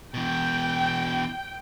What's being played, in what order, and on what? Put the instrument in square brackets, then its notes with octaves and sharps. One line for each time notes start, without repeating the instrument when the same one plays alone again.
[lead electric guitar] B2 E3 [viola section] G5